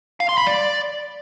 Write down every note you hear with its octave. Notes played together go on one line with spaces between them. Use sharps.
F5
C6
B5
D5